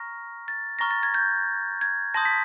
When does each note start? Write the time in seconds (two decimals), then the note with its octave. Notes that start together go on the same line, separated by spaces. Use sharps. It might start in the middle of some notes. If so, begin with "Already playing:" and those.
Already playing: A#5 C#6 F6 A#6
0.48 A6
0.79 A#5 C#6 F6 A#6
0.91 A6
1.03 G#6
1.14 G6
1.81 G#6
2.14 A5 C6 D#6 G6 A#6
2.25 B6